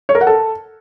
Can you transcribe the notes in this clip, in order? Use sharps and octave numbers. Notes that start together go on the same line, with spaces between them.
C#5
A#4
F#5
A4